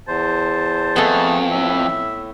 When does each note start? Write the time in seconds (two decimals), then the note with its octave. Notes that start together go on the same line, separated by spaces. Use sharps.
0.08 E2 C5 A5
0.96 F2 A3 B3 G#4 A4
1.51 A2 E5